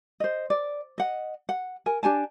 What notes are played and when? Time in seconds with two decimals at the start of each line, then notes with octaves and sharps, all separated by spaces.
0.20 C5 D#5
0.50 D5
0.98 D#5 F#5
1.49 F#5
1.86 A#4 G#5
2.03 D4 G4 G#5 A5